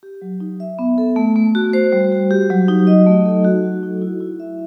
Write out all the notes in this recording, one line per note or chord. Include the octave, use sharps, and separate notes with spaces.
G4
F#3
D#4
E5
B3
A4
A3
A3
F#4
C5
G3
F#4
G4
F#3
D#4
D#5
A3
A4
F#4
F#3
D#4
E4
E4
E5